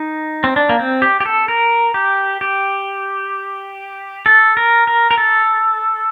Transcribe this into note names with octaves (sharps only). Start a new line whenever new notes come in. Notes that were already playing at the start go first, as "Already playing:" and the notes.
Already playing: D#4
C4
D4
A#3
C4
G4
G4
A4
A#4
G4
G4
A4
A#4
A#4
A#4
A4